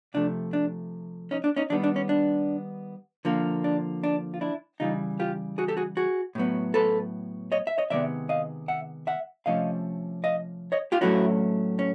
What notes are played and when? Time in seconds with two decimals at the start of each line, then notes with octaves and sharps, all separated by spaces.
0.14 C3 F3 A3 D4
0.53 D4
1.31 C#4 D#4
1.44 D4
1.56 C#4 D#4
1.70 D#3 G3 B3 D4
1.84 D4
1.96 C#4
2.09 D4
3.25 D3 F3 A#3
3.64 D4
4.03 D4
4.34 F4
4.41 D4 E4
4.80 C#3 E3 G3 D#4 F4
5.20 F4 G4
5.58 F#4 G#4
5.68 G4 A4
5.77 F#4 G#4
5.97 F#4 G#4
6.35 A2 F#3 B3
6.74 A4 B4
7.52 C#5 D#5
7.67 E5
7.78 C#5 D#5
7.90 C3 D#3 G#3 B3 D5 E5
8.29 D#5 F5
8.68 E5 F#5
9.07 E5 F#5
9.46 C3 F3 A3 C#4 D#5 F5
10.24 D#5 F5
10.72 C#5 D#5
10.92 F4 G4
11.01 A2 F#3 A3 C#4 E4 F#4
11.79 C#4